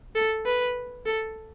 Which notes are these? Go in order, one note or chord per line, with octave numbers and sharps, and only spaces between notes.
A4
B4
A4